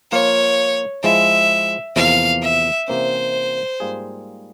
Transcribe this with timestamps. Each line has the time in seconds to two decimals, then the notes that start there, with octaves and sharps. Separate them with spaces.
0.11 F3 A#3 F4 C#5
1.03 F3 G#3 E4 E5
1.96 E2 C3 F3 A#3 F5
2.43 E5
2.88 C3 E3 A#3 C#4 C5
3.80 G#2 G3 A#3 F4 G#4